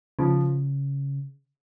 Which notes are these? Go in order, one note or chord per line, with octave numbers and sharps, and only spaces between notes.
C#3 F3